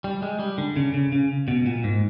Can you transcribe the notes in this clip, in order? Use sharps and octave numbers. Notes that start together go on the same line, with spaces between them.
G3
G#3
G3
D3
C#3
C#3
C#3
B2
A#2
G#2